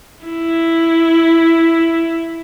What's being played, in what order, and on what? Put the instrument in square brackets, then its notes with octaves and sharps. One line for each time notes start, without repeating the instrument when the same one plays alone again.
[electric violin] E4